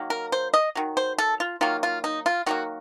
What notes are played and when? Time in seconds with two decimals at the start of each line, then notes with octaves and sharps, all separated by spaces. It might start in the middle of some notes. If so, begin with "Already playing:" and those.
Already playing: D#3 F#3 A#3
0.10 A#4
0.32 C5
0.54 D#5
0.75 D#3 F#3
0.97 C5
1.18 A4
1.40 F4
1.61 D#3 F#3 A#3 F4
1.83 F4
2.04 D#4
2.26 F4
2.46 D#3 F#3 A#3 F#4